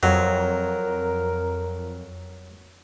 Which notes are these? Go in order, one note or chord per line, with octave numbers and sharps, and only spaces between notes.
F2 F#3 A#4